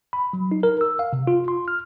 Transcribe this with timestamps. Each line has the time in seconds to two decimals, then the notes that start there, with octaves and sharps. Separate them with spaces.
0.13 B5
0.33 F#3
0.52 D#4
0.63 A#4
0.81 E6
0.99 F5
1.13 C3
1.27 F4
1.48 C6
1.68 F6